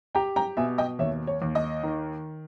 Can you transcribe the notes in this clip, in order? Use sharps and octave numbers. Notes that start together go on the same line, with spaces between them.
G4 G5 A#5
G5 A#5
B2 E5 G#5
D#5 G5
D#2 C#5 E5
C#5
D#2
D#5
D#3